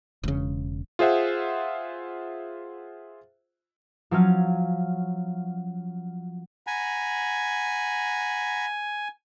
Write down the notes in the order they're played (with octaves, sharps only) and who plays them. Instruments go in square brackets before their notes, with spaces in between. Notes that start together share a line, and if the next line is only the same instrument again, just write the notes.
[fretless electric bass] E1 C#3
[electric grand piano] F4 G#4 C5 E5 F#5
[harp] F3 F#3 C#4 F5
[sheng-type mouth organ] F#5 A#5 B5 [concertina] G#5